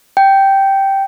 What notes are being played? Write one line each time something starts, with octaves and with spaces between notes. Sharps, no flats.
G5